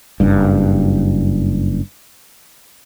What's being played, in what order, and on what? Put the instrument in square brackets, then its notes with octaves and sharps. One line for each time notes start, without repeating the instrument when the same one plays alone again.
[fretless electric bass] F#1 G2